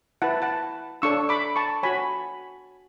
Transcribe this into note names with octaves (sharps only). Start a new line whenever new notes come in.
E4 B4 F#5 A5
F#5 A5
D4 A4 C#5 C#6 E6
B5 D6
A5 C#6
F#4 C#5 G#5 B5